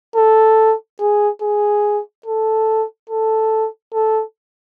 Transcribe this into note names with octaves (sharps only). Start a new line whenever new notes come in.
A4
G#4
G#4
A4
A4
A4